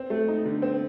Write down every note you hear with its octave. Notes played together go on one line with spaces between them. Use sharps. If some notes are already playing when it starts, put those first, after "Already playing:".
Already playing: C4
A3
D#4
D3
C4